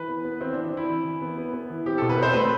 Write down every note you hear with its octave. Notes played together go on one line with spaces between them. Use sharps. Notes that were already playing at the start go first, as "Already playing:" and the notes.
Already playing: E3 B4
B3
B3
E3 C4
E3 D4
C4
E3 E4
E3
E3
B3
B3
B3
E3
C4 G4
B2 A4
B4
C4 C5
A3 B4